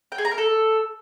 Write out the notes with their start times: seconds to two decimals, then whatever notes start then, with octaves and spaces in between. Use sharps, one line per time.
0.12 G5
0.18 G#4
0.25 A#5
0.31 A#4
0.38 A4